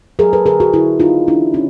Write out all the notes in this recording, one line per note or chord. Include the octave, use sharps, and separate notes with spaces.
F#3 G#4 A#4
A4 B4
D3 G#4 A#4
F#4 G#4
D3 E4 F#4
A#3 D#4 F4
E3 D4 E4
C#3 C#4 D#4